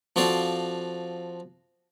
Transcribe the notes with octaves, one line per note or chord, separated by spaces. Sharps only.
F3 C4 F#4 A4 D5 F5